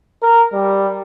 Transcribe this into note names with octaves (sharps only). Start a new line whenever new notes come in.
A#4
G3